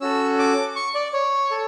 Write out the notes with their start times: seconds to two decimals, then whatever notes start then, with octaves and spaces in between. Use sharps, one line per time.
0.01 C#4 F#4 A4 E6
0.39 D6
0.76 C#6
0.95 D5
1.13 C#5
1.51 A4